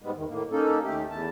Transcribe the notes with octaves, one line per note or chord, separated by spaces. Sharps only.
G#2 G3 G#3 B3
E2 D#3
A2 A#3
A#3 C#4 D#4 A4
D#2 A3 G4
E2 A5